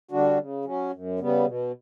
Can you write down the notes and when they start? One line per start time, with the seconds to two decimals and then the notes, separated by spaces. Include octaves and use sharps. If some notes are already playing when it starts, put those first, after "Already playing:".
0.11 D3 G3 D4 F#4
0.38 C#3
0.65 F#3 C#4
0.93 F#2
1.19 C#3 G3 B3
1.45 B2